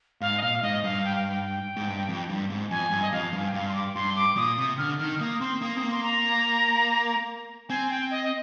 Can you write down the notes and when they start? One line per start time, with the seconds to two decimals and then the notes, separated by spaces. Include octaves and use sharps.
0.21 G#2 F5
0.38 D#5
0.42 A#2 F5
0.58 F5
0.63 G#2 D#5
0.84 G2 F5
1.05 G5
1.16 F5
1.27 G5
1.46 G5
1.77 G#2
1.88 G2
2.09 F2
2.29 G2
2.50 G#2
2.71 F2 G#5
2.91 G2
3.02 D#5
3.12 F2 F5
3.33 G2
3.39 G#5
3.46 G5
3.54 G2 F5
3.68 C6
3.74 D6
3.95 G2 C6
4.16 D6
4.36 A#2 D#6
4.58 C3
4.78 D3 F6
4.99 D#3 F6
5.20 A#3 D#6
5.41 C4 C6
5.62 A#3 D#6
5.77 C4
5.83 A#3
5.92 C6
6.03 A#5
7.69 C4 G#5
7.90 G5
8.11 D#5
8.23 D#5